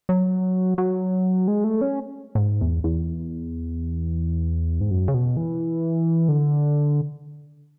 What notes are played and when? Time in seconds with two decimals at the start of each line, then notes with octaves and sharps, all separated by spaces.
0.09 F#3
0.78 F#3
1.48 G#3
1.64 A3
1.81 C#4
2.35 A2
2.38 G#2
2.61 E2
2.84 E2
4.81 G#2
4.91 F#2
5.08 C#3
5.14 B2
5.37 E3
6.29 D3